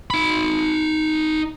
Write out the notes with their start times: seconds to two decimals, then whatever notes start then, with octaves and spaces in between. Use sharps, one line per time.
0.10 D#4 B5